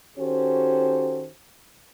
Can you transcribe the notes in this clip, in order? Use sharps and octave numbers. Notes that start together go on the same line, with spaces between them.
D#3 C#4 F#4 G4 A4 C5